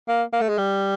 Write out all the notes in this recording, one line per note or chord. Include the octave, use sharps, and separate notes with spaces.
A#3
A#3
A3
G#3
G3